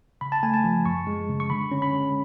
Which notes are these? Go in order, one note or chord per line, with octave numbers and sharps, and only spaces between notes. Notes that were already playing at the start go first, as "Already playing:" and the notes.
C#3 B5
A5
A3 G#5
A5
F3
F#2 C#6
G#3
C#3
C#6
D3 B5
C#4
B5
G#3